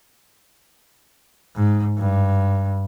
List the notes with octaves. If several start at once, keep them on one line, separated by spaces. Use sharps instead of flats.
G#2
G2